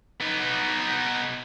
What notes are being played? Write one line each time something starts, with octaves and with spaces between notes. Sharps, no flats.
B3 D#4